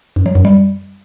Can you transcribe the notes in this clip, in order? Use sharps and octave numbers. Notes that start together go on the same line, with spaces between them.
F#2
F#3
F#2
G3